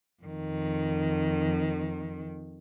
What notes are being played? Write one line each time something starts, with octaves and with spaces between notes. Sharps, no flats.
F2 D#3